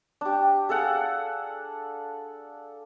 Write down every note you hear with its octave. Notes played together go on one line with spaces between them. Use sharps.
D4 G4
G#4 A4 F5 F#5